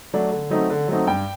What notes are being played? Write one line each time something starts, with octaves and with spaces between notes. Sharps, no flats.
F#3 A3 D4
D3
F#3 A3 C4 D#4
D3
F#3 A3 C4 D#4
G2 G5